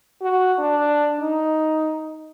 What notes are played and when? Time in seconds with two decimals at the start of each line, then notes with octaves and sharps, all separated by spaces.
0.22 F#4
0.59 D4
1.21 D#4